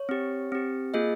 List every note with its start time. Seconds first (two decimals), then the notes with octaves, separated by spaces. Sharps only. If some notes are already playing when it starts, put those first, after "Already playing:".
Already playing: C#5
0.09 C4 G4
0.52 C4 G4
0.94 A#3 F4 G#4 D#5